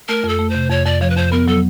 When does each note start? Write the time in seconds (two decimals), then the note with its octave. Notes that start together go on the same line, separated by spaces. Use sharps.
0.08 A3 A#4
0.24 F2 A4
0.39 A3
0.49 C5
0.55 C3
0.70 F2 C#5
0.85 F2 D5
1.01 F3 C#5
1.10 B4
1.16 F2 C5
1.32 B3 A#4
1.47 F#3 A4